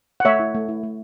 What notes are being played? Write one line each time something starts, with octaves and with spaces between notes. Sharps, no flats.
F#5
A3 C#5 E5
E4
A3
E4
A3